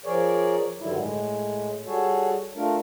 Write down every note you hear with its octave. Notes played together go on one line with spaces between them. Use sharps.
F3 G#4 A#4 C#5 D5
G2 D3 D#3 F#3 G3 E4
A2 G#3
G3 F#4 G#4 A4 C#5
A3 D4 F4 A#4